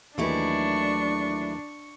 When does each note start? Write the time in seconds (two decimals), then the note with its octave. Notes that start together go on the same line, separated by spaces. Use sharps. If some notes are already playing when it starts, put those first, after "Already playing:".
0.18 D#2 D#3 E3 F#3 A3 D4 E4 C#6